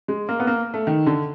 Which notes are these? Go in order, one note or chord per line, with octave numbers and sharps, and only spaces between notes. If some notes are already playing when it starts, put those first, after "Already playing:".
G#3
A#3
B3
A#3
A3
D#3
D3